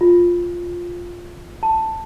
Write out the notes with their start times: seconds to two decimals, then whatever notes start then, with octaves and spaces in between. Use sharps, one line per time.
0.01 F4
1.63 A5